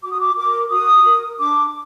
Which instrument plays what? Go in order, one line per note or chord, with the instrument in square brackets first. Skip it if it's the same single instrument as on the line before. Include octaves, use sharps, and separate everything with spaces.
[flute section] F#4 D6
D#6
D6
A#4 D6
F#4 D#6
A#4
D4 D6